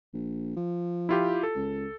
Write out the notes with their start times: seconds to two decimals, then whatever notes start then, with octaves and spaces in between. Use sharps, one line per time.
0.14 A#1
0.56 F3
1.09 E4 F4 G4
1.43 A4
1.56 C#2